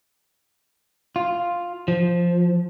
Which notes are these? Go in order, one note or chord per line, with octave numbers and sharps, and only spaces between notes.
F4
F3